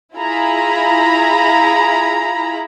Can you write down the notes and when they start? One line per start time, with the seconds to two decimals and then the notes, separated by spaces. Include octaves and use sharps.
0.15 E4 F4 G#4 A#5 B5